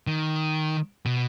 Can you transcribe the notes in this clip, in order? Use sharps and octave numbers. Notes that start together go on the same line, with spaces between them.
D#3
B2